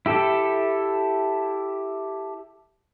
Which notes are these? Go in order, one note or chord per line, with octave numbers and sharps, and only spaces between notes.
E4 G4 A4